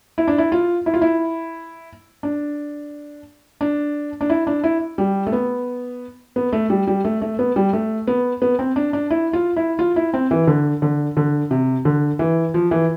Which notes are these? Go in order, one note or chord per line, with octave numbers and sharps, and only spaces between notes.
E4
D4
E4
F4
E4
F4
E4
D4
D4
D4
E4
D4
E4
G3
A3
B3
B3
A3
G3
G3
A3
A3
B3
G3
A3
B3
B3
C4
D4
D4
E4
F4
E4
F4
E4
C4
E3
D3
D3
D3
C3
D3
E3
F3
E3